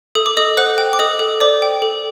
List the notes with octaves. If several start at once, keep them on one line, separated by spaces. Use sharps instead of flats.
A4 D#6
D6
A4 D#5 D#6
C5 F#5 F#6
G5
D6
A4 D#5 D#6
A4
C5 D5 D6
G5
A4